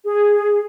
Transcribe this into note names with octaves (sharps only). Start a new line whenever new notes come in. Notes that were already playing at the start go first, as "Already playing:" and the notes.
G#4